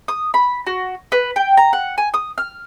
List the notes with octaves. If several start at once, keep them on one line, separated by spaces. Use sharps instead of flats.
D#6
B5
F#4
B4
G5
A#5
F#5
G#5
D#6
F6